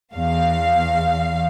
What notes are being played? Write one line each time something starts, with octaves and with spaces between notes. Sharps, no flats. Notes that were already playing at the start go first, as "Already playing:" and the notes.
E2 F5